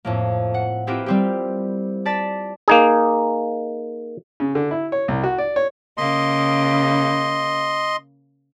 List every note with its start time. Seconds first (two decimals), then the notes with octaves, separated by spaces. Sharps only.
0.05 F2 A2 A#3
0.54 F#5
0.87 C4 E4 F4 G4 A#4 B4
1.06 G3 C4 G4
2.05 D5 A5 A6 B6
2.68 A#3 D#4 G#4
4.40 C#3
4.55 D3
4.71 E4
4.92 C#5
5.08 C2
5.23 F#4
5.38 D5
5.56 C#5
5.97 C#3 A#3 D#5 C6